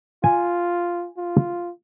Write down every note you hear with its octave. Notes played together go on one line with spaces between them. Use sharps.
F4 G#5
F4